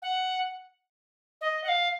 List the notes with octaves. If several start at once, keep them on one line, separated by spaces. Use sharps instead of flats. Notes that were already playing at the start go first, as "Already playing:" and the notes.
F#5
D#5
F#5
F5